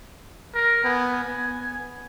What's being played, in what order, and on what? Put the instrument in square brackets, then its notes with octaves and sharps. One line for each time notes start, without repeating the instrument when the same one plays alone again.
[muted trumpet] A#4
[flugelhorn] B3 [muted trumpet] G#5
[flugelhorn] B3